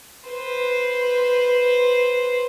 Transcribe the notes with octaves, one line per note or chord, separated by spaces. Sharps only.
B4 C5